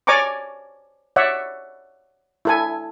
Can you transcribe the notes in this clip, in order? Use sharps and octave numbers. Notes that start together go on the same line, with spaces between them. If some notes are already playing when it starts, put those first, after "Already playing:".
C#5 D5 G#5 A#5 C#6 D6
C#5 D5 E5 F#5
E4 A4 G#5